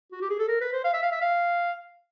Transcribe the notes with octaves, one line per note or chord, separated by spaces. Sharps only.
F#4
G4
G#4
A4
A#4
B4
C5
F5
E5
F5
E5
F5